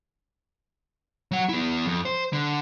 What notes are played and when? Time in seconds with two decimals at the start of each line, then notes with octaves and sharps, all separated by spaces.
1.31 F#3 F#5
1.49 B3 E4
1.86 F2
2.05 C5
2.33 D3